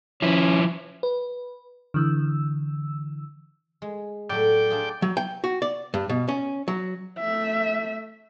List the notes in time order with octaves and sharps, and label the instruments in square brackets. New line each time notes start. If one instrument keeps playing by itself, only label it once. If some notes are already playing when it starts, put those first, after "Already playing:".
[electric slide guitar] F3 E4 [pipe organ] C#4
[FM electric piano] B4
D3 E3 E6
[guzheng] G#3
[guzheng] A2 F#3 A3 [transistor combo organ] D5 G5
[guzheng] D4 F4 G#4
[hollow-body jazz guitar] F#3
G5
F#4
D5
G2
B2
C#4
F#3
[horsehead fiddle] A3 E5